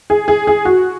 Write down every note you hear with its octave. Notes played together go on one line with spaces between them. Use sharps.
G#4
G#4
G#4
F#4